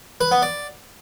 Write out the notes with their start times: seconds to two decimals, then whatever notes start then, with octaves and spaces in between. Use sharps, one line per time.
0.21 B4
0.31 B3
0.42 D5